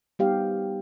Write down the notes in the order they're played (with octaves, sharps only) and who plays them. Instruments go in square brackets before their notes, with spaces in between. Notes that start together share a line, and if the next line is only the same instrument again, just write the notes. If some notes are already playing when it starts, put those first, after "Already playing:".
[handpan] G3 B3 D#4 G4 C5 F5